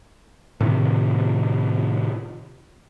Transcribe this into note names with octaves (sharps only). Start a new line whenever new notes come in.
A2 C3 D#3